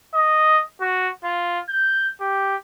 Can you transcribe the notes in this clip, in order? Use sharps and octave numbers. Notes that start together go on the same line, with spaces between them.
D#5
F#4
F4
G6
G4